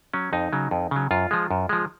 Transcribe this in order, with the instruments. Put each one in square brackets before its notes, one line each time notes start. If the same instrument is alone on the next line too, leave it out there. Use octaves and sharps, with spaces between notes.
[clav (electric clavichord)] F#3 C#4
F2 D#4
C#3 F#3
F2
C#3 F#3
F#2 F4
F3 G#3
F#2
F3 G#3